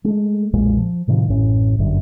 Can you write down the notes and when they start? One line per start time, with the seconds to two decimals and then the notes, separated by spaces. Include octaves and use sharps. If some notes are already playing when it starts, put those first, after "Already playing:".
0.04 G#3 A3
0.53 B1 F2 A#2 G#3
0.78 F3
1.08 A2 C3 D#3 F3
1.29 A1 F#2 A2 C#4
1.79 G1 F#2 D3